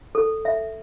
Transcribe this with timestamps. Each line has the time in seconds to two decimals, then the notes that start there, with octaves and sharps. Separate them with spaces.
0.15 A4
0.45 E5